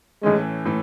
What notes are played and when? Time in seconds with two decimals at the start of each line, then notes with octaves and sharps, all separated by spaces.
0.23 A2 E3 G#3 A3 C#4
0.65 A2 E3 A3